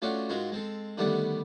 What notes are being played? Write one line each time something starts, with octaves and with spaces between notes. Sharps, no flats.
A3 C#4 D4 F4 F#4
G#2 G#3 F4 F#4 A#4
G#3 C4 A4
D3 D#3 G3 A3 B3 D4